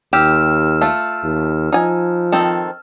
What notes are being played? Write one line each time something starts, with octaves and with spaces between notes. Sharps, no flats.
D#2 G4 E6 F6 E7
A3 F4
D#2
F3 D#4 G#5
D#3 C4 A4